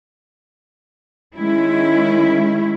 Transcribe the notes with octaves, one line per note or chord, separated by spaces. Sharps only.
D#3 G#3 C#4 E4